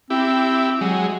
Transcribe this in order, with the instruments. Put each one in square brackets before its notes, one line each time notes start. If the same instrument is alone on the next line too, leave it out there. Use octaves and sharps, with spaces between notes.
[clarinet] C4 [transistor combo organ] E4 G4
[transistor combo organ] F#3 G#3